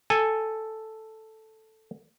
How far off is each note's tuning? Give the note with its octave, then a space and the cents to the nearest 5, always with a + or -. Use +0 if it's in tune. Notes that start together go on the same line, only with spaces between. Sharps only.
A4 +0 G#5 -5